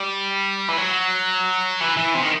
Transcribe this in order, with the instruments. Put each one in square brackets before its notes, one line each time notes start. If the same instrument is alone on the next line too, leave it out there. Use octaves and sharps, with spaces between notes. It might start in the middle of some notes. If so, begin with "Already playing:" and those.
Already playing: [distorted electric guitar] G3
E3
F#3
E3
E3
C3
D#3